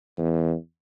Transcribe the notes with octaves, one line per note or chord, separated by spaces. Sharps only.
E2